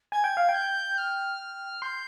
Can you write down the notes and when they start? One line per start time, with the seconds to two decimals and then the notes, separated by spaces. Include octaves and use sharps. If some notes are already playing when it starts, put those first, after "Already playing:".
0.12 G#5 G#6
0.24 G5
0.37 F5
0.49 G5
0.54 G6
0.98 F6
1.82 C6 G6